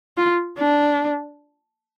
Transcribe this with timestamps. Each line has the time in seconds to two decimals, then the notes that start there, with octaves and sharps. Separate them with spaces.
0.17 F4
0.58 D4